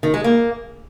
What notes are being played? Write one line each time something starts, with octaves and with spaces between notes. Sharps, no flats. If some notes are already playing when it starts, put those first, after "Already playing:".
D#3
G#3
A#3